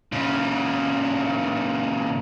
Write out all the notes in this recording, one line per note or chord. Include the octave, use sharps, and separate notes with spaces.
A#2 C#3